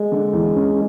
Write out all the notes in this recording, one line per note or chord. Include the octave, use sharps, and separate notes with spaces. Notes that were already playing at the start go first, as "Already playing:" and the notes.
Already playing: G#3
D3
E2
C#4